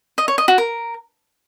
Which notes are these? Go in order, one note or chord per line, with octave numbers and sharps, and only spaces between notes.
D#5
C#5
D#5
F#4
A#4